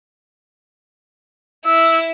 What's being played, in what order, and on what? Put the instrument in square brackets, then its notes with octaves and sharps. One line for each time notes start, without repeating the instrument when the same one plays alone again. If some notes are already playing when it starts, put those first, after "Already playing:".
[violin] E4 [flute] E6